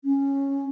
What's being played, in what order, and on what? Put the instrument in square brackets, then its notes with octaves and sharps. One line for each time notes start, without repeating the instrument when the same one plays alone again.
[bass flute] C#4